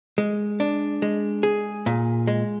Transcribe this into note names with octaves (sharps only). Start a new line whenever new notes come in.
G#3
D4
G#3
G#4
A#2
G#3